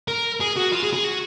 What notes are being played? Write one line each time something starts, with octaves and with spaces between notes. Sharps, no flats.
A#4
G#4
F#4
F4
G#4
G#4
F#4